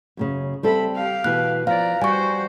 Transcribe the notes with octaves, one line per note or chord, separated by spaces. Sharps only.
F#2 A#2 C#3
G3 C4 A4 E5 B5
G4 F5
B2 E3 F#6
F3 D5 F5 A#5
G3 F#4 C5 G#5 C#6